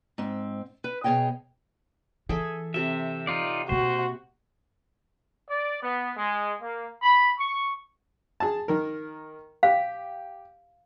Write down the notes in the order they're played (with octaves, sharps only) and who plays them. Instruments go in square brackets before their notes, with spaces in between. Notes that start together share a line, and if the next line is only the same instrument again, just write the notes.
[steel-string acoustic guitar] G#2 C4
B4
B2 G#4 C#5 D#5 G5
[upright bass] E3 [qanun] G#4 A4 E5
[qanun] C3 A4 [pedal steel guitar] E5
[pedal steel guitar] D#4 F4 D5
[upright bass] B2 A#3 [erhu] F#4 [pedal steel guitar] C5
[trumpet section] D5
B3
G#3
A#3
B5
C#6
[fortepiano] G#4 A5
D#3 A#4
[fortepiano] G4 [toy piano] F5